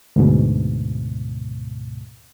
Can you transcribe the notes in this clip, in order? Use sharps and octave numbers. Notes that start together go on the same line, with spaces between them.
D2 G#2 B2